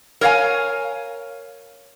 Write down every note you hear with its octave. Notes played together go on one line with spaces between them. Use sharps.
A#4 C#5 E5 F5 G#5